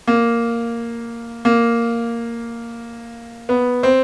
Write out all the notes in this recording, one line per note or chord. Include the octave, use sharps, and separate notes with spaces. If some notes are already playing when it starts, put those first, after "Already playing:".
A#3
A#3
B3
C4